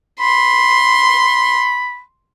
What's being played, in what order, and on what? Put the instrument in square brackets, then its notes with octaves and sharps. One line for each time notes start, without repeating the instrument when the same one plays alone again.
[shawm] B5 [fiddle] C6